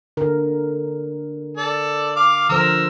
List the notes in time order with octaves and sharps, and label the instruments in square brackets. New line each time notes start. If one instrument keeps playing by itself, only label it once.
[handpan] D3 A#4
[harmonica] A4 D5
F5 D6
[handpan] D3 F3 C5 [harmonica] A#4 E6